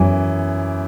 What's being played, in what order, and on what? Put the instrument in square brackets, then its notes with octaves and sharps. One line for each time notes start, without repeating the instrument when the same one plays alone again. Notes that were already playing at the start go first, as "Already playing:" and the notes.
Already playing: [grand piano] F#2 E3